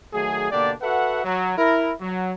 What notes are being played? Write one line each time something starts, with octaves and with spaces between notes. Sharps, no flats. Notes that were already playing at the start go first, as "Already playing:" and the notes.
D#3 F#3 A3 G#4
B2 D3 A#3 D4 G4 D5
F#4 A4 B4 E5 F#5
F#3
E4 A#4
F#3